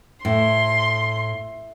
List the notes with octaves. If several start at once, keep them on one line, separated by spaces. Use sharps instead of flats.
A2 C6